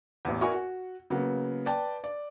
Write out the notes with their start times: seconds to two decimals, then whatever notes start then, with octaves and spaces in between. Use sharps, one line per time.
0.25 A1 E2
0.41 E4 F#4 A#4 D5 G#5 C#6
0.53 F#4
1.10 C#3 F#3 A#3 B3
1.66 B4 D5 G5 A5
2.04 D5